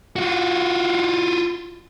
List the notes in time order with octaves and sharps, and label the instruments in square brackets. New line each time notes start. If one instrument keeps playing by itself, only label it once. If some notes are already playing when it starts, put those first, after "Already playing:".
[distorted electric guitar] F4 F#4